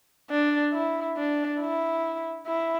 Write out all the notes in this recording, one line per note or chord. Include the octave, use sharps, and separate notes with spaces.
D4
E4
D4
E4
E4